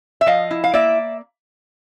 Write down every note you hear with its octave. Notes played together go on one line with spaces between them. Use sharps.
E5
F3 D#5 F5
E4
F5
A#3 D5 E5